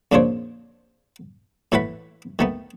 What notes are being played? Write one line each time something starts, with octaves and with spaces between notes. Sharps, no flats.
F2 A#2 C#3 D4 C5 C#5
A2 E3 A3 B4 F#5 B5
D#3 A3 B3